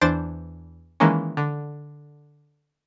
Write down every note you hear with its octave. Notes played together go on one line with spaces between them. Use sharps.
E2 E3 D4 C5 A6 D7
D#3 E3 G#3 A#3 C#4
D3